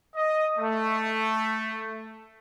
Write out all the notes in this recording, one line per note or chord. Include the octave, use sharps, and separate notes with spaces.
D#5
A3